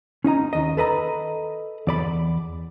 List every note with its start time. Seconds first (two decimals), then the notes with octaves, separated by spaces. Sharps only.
0.24 C#4 D#4 D#5 A#5
0.53 D#2 D#5
0.77 A4 B4 D#5 A#5
1.87 E2 D5 B5